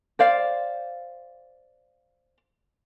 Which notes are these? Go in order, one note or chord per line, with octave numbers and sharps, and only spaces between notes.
C5 D5 F5